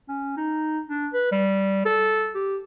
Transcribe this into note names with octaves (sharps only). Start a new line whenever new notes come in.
C#4
D#4
D4
B4
G3
A4
G4